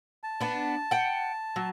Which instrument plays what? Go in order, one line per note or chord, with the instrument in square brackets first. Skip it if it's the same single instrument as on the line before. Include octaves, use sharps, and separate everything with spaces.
[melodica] A5
[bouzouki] B3 D4
F#5 G5
F#3